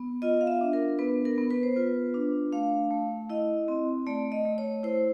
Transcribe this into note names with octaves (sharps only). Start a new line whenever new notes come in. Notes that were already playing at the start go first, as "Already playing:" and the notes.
Already playing: B3
F4 D#5
F5
E5
D4
A#4
B3 B4
A#4
B3
B4
C5
F4 B4
D4
A3 F5
A3
E4 D#5
C4
A3 D5
D#5
A3
C#5
E4 C5